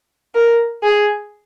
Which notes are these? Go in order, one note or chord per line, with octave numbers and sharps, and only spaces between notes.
A#4
G#4